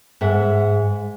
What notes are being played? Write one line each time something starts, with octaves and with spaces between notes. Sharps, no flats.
G#2 E5 F#5